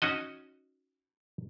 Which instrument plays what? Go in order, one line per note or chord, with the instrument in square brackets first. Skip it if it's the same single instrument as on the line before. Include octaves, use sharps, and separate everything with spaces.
[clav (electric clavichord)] C#4 D#4 F#4 D#5